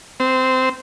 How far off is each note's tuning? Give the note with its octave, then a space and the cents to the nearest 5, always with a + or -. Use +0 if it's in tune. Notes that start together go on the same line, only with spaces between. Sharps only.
C4 -15